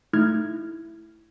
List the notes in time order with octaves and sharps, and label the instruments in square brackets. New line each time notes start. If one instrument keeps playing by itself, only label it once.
[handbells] A3 D#4 E4 F6 G#6